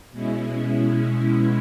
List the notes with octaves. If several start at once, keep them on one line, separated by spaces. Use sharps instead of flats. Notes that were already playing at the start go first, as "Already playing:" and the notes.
B2 G#3 C#4 E4